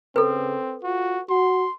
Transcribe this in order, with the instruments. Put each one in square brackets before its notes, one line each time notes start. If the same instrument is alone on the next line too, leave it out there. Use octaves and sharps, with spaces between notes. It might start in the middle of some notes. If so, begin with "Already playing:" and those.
[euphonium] C#3 [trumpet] C4 [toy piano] A4 B4
[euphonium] F4 [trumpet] F#4
[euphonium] F#4 [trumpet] C6